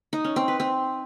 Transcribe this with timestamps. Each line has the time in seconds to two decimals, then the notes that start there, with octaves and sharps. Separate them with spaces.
0.13 D#4
0.24 C#4
0.36 C4
0.48 B4
0.60 C4